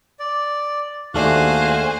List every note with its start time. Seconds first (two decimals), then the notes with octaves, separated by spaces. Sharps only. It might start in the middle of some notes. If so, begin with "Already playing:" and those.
0.20 D5
1.14 D#2 A3 D4 F#4 G#4 C5 F5 F#6